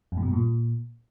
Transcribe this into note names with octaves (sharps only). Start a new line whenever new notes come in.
F2
G#2
B2
G2
A#2